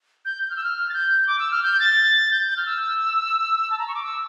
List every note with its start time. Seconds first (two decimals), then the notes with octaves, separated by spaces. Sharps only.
0.25 G6
0.43 G6
0.50 F6
0.56 E6
0.64 F6
0.89 A6
0.94 G6
1.27 D6
1.39 E6
1.51 F6
1.63 G6
1.80 A6
2.32 G6
2.49 G6
2.57 F6
2.66 E6
3.71 A5
3.78 A#5
3.88 C#6
3.95 D6
4.03 E6